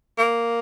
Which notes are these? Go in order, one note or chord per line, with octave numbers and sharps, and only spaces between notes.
A#3